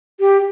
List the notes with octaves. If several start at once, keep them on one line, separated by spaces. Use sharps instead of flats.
G4